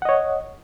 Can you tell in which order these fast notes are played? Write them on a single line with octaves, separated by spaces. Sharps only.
F#5 D#5 C#5